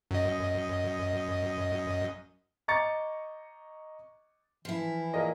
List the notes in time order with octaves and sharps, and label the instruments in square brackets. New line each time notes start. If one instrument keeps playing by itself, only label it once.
[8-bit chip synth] F#2 D#5
[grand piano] D#5 A#5 C#6 D6 A6 C#7
[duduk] E3 [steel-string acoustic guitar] F3 E4
[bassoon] A#2 [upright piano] A#4 D#5